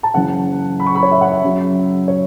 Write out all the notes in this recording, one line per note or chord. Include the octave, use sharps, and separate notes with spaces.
A5
F#1 F#2 E3 F#5
B5
C#6
B5
C#5
E5
F#5
E5
F#1 F#2 C#3 F#3
C#5